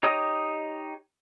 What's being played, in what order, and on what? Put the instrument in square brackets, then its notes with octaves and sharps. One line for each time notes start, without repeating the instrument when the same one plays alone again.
[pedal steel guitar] D#4 G4 C#5 D#5 D#6